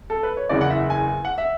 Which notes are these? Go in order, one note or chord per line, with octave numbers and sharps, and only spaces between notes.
A4
B4
C#5
F#1 E2 C#3 D5
F#5
E5
G#5
F#5
E5